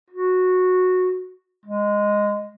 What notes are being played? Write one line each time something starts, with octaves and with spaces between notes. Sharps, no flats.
F#4
G#3